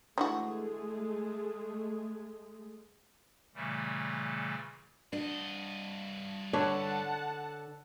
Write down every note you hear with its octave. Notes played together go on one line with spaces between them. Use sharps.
D3 E3 G#3 A3 F#4 G#4
A#2 C#3 E3 G3 A3
G2 D4 F#4 D#5
D3 D4 B4 C#5 F#5 A5